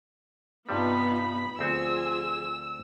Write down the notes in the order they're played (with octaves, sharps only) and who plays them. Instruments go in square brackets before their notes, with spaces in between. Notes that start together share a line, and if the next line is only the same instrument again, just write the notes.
[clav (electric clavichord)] G2 C3 G3 [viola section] B3 D#4 F4 [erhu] B5
[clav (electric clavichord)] D2 C4 F#4 [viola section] F3 G#4 G#5 [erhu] E6